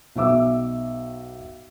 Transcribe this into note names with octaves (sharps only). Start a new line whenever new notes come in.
B1 E5 D6 E6